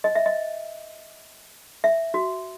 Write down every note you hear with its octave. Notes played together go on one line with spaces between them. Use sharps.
D#5
E5
D#5
E5
F#4